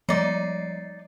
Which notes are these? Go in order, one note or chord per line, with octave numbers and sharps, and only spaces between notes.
F3 G3 D#4 D5 C7